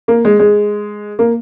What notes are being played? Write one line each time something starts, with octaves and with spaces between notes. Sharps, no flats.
A#3
G#3
G#3
A#3